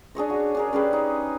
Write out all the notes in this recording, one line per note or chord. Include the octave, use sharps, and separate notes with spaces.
D4 G#4 C#5 D#5
F#4
D4 G#4 A#4
C#4 G4 G#4 B4
D#4